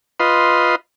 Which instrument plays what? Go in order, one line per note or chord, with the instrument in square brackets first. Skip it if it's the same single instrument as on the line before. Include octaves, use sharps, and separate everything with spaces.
[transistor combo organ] F4 B4 D#5 C6